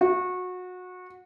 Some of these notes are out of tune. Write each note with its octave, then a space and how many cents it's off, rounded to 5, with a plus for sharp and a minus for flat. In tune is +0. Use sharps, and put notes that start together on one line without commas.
F#4 -25